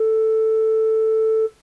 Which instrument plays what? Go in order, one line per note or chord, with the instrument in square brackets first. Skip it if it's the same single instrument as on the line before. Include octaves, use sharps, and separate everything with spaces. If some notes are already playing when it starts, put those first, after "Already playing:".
Already playing: [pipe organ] A4